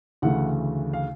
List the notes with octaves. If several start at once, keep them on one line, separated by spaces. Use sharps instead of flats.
D2 C#3 E3 A3 F#5
F5